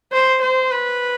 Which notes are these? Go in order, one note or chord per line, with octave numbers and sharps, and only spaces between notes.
C5
C5
B4